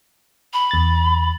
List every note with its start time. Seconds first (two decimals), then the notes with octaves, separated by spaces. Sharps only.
0.53 B5
0.71 E2 A6